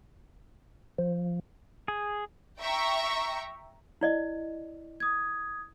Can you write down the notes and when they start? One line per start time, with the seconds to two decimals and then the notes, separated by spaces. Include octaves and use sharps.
0.98 F3
1.88 G#4
2.59 E5 G5 A#5 C#6
4.01 E4 D5 D#5
5.00 D#6 G#6